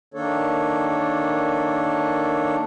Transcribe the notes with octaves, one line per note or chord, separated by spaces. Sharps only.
D#3 A#3 D4 A4 C#5